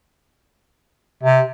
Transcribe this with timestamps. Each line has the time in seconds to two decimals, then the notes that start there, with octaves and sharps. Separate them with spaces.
1.23 C3